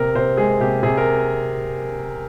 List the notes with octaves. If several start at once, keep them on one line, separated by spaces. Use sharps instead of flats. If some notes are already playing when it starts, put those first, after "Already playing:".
Already playing: C3 A#4
C3 C5
G#3 G#4
C3 G4
C3 G#4
A#4